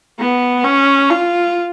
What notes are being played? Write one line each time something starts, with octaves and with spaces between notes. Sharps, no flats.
B3
C#4
F4